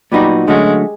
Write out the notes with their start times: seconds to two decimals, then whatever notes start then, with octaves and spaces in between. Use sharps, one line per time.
0.12 A#2 F#3 G3 B3 D#4 F#4
0.48 D3 F#3 G#3 A3 C#4 F#4